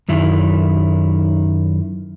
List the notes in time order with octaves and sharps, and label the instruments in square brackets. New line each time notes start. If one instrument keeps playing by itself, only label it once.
[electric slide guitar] F#2 D#3 E4